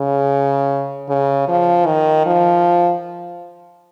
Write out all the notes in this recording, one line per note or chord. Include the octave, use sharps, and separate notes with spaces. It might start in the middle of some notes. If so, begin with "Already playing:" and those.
Already playing: C#3
C#3
F3
D#3
F3